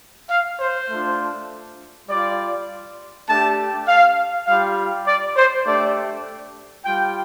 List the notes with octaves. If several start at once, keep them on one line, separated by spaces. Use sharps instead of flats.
F5
C5
A3 D4 F4
G3 F4 D5
A3 D4 G4 A5
F5
G3 F4 F5
D5
C5
A3 D4 G4 D5
G3 F4 G5